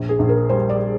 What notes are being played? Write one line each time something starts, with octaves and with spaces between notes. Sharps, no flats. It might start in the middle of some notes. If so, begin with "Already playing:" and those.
Already playing: A#1
G#4
A#1
A#4
G3 C5
D5